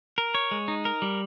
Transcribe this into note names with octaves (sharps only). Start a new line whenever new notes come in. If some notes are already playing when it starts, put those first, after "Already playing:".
A#4
C#5
G#3
D#4
A#4
G3